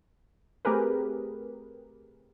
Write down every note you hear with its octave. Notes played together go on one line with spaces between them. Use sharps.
A3 C4 G4 G#4 A#4 B4